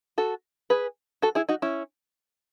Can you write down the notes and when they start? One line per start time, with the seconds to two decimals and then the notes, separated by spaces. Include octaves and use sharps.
0.18 F#4 A4
0.70 G#4 B4
1.22 F#4 A4
1.35 E4 G#4
1.49 D#4 F#4
1.62 C#4 E4